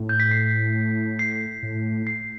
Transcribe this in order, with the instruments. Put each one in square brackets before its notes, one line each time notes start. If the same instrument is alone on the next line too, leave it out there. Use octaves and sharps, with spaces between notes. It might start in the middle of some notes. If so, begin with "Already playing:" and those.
Already playing: [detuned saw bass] A2
[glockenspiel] G6
B6
C7
C7
[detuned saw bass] A2
[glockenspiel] C7